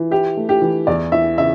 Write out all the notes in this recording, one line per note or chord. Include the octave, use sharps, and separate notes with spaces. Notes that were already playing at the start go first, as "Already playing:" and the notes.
Already playing: E3
E4 G4
A3
G4
E3
E2 D5
E3 E5
C#3 E5